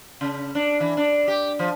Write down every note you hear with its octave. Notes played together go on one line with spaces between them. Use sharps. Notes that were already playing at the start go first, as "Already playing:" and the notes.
C#3
D4
E3
D4
G4
F3